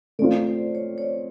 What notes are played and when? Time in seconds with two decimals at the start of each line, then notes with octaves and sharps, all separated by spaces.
0.19 A3 C4 F4 D5
0.47 C5
0.75 C#5
0.98 C#5
1.02 D5